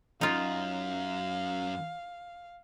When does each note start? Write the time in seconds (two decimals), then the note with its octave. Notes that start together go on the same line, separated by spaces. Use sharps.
0.21 F#2 D#4 F4 F5